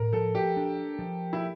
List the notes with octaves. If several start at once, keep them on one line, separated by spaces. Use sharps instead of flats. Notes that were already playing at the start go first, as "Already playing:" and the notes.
Already playing: A2 A#4
F3 A4
G4
D4
F3
E4